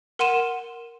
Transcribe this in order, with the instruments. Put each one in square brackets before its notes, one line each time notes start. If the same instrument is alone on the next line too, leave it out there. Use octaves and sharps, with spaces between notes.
[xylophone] A#4 F#5 C6 D#7 E7